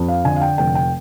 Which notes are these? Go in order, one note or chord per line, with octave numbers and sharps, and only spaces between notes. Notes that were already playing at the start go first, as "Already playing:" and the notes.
Already playing: F2
F5
D3 G#5
F5
G5
F1 G5
G5